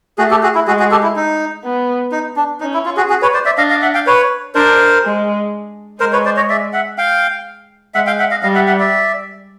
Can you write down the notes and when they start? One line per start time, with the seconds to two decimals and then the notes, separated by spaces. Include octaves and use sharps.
0.18 A3 F#4 G#4
0.31 G4 A4
0.43 F#4 G#4
0.55 E4
0.67 G#3 F#4 G#4
0.79 F#4 G#4
0.91 G4 A4
1.03 E4
1.16 D#4
1.64 B3
2.12 D#4
2.36 D4
2.61 C#4 D#4
2.74 E4
2.85 F4
2.97 F#4 G#4
3.10 F#4 G#4
3.22 B4 C#5
3.34 C5 D5
3.45 D5 E5
3.58 D4 D#5 F5
3.70 D#5 F5
3.82 E5 F#5
3.95 F5 G5
4.07 B4 C#5
4.55 D4 A#4 C5
5.03 G#3
6.00 G#3 A#4 C5
6.12 B4 C#5
6.25 C5 D5
6.36 C#5 D#5
6.49 D5 E5
6.73 E5 F#5
6.98 F5 G5
7.94 G#3 E5 F#5
8.07 F5 G5
8.20 E5 F#5
8.31 D#5 F5
8.43 G3 D#5 F5
8.55 E5 F#5
8.67 E5 F#5
8.79 D5 E5